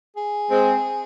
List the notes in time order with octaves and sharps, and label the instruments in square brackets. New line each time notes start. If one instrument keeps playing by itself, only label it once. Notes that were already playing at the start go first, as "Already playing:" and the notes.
[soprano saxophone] G#4
[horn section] G#3 C4